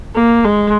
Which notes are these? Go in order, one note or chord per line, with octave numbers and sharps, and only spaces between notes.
A#3
G#3